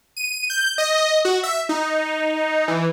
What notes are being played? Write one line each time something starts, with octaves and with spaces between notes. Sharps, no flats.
D#7
G6
D#5
F#4
E5
D#4
E3